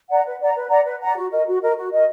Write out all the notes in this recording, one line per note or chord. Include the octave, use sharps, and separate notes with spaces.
D5 F#5 A#5
B4
D5 F#5 A#5
B4
D5 F#5 A#5
B4
D5 F#5 A#5
F#4
A#4 D#5
F#4
A#4 D#5
F#4
A#4 D#5